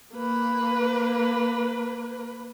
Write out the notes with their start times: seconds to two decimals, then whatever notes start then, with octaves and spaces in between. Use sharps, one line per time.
0.14 A#3 B4